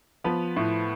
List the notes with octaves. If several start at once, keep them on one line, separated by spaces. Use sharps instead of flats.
F3 B3 B4
A2